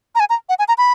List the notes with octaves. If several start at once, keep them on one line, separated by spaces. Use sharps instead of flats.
A#5
G#5
A#5
F#5
G#5
A#5
B5